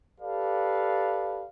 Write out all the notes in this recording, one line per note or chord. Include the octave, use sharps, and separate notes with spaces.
G4 A4 B4 D5 F5